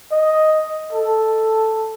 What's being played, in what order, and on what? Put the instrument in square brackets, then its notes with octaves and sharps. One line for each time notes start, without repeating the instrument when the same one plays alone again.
[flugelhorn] D#5
A4